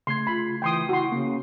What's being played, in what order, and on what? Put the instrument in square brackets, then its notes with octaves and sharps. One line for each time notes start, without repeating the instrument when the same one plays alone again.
[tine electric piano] C#3 A3 G#6 [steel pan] C6
[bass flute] F4 [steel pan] B5
[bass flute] E3 [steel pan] G5 C6 D#6
[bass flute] E4 [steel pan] F#4 C6
[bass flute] C#3 [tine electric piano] A#3